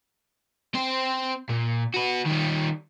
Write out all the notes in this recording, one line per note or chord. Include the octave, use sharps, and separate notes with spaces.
C4 C5
A#2
F#4 B4
D#3 G3